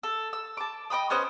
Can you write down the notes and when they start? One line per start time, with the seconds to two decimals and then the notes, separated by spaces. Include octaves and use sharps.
0.03 A4
0.33 E6
0.57 A5 D6
0.90 D#5 G5 B5 D#6
1.10 B3 C#4 C5 D#5